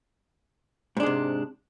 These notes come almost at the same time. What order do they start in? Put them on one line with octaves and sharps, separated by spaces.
G#2 D4 G#3 C3